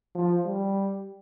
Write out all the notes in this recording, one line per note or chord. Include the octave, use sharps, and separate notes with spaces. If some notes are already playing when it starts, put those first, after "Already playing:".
F3
G3